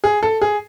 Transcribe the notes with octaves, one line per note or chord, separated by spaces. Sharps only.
G#4
A4
G#4